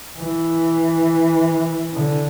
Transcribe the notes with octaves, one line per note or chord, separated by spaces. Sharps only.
E3
D3